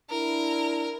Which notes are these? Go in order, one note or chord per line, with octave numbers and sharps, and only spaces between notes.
D4 E4 A#4